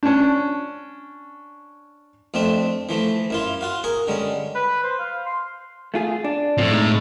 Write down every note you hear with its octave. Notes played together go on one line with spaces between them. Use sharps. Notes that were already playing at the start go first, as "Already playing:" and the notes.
C#4 D4
F2 A3 C4 D4
E3 F3 A3
F#2 E4 F4
F4 F#4 F5
G#4 A#4 C#6
D3 G3 G#3 C#4
B4
C5
F5
C6
A3 F4 G#4
D4
A2 F3 C4
G#3 D#4